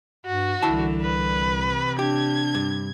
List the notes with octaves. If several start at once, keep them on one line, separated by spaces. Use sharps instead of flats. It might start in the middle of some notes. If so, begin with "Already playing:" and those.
G2 F#4
C2 D3 E3 E4 A5
B4
C3
D4 G4 G#6
G2